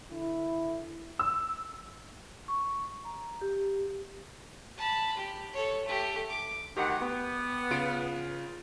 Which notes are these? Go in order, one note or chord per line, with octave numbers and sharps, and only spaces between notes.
D3 B3 E4
E6
C#6
A#5
G4
A5 B5
G4
A4 C#5
A3 G4
D6
D2 D#3 G4 F#5
B3
C#3 F4 D7